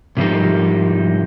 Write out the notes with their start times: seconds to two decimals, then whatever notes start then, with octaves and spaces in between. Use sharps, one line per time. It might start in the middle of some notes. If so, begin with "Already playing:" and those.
0.17 G#2 C3 F3 G3 A#3 D#4